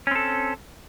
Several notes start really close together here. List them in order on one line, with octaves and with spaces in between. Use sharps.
C#4 C4 A4